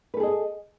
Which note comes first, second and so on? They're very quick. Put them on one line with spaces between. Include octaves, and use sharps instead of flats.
B4 A4 G#4 D#5